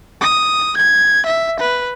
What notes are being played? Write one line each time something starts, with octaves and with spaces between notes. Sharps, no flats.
D#6
G#6
E5
B4